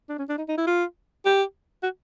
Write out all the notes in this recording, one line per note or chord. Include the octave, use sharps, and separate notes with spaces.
D4
C#4
D4
D#4
D#4
E4
F4
G4
F#4